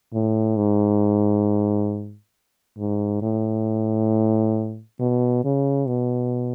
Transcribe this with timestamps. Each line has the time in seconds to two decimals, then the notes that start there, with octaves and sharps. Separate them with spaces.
0.14 A2
0.57 G#2
2.79 G#2
3.22 A2
5.00 B2
5.45 C#3
5.88 B2